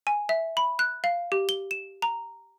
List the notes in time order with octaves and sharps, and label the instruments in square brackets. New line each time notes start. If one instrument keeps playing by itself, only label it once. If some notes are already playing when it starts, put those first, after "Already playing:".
[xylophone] G#5
E5
B5
F#6
F5
G4
G7
E7
A#5